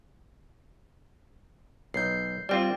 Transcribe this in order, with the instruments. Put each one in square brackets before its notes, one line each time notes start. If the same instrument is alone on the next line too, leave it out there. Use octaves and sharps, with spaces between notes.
[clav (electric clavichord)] B1 [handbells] G6 C7
[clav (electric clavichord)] G3 C4 F4 [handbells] D5 G5